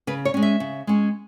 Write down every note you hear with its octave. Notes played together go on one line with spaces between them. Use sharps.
C#3 B4
C#5
G#3 C#4
E5
C#3
G#3 C#4